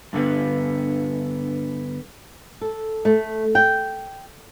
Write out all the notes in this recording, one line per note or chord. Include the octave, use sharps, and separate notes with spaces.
G2 D3 B3
A4
A3
G5